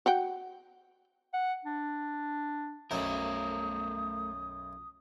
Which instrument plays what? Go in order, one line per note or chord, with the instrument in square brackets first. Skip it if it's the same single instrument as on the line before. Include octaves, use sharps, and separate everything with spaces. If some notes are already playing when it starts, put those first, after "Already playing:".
[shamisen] F#4 F#5 G5
[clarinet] F#5
D4
[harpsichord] B1 F#2 C5 [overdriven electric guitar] A3 A#4 [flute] D#6